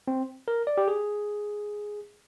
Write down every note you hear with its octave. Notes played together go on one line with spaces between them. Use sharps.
C4
A#4
D5
G4
G#4